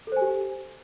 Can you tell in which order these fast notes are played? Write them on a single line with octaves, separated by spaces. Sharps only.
A4 C5 G#5 G4